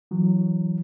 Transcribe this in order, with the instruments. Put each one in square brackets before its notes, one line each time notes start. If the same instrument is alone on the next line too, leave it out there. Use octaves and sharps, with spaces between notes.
[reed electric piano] E3 F#3